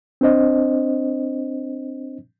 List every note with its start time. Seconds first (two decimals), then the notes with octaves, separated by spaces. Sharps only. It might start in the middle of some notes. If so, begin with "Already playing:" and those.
0.21 C4 D4 C5 D#5